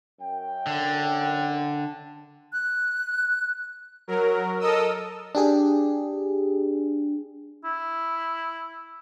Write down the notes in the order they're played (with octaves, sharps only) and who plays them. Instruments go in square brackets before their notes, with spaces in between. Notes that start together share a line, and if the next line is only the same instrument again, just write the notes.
[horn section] F#2 G5
[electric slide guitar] D3
[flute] F#6
[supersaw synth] F#3 A#4
A4 A#4 D#5 D#6 E6
[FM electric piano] D4 G4 G#4
[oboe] E4